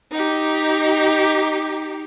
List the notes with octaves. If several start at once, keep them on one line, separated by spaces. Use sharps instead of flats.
D#4 G4